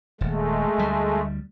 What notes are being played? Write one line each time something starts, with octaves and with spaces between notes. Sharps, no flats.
D#1 G#3 A3
D2 G3